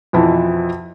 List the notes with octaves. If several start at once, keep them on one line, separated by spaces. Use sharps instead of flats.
F2 B2 E3 F3 E4 A5